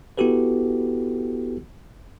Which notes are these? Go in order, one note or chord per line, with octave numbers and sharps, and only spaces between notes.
B3 E4 F#4 G4 A4 B4